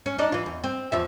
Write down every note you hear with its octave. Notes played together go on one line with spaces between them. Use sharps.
C#4
D4 D#4 D5
E3 F4
E2
C4
E2 F3 E5